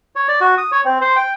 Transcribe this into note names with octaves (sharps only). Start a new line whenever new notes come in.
C#5
D5
F#4
D#6
C#5
C4
C5
G5